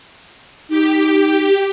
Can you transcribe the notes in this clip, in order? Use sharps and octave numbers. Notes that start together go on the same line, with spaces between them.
D#4 G4